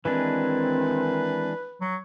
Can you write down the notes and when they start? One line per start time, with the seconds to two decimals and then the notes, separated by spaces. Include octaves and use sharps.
0.05 D#3 E3 G#3 C4 D4 B4
1.81 F#3